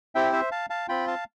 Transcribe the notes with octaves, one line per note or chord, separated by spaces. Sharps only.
C4 E4 G4 E5 G5
C5 E5
F5 A5
F5 A5
C4 F4 G5 B5
F5 A5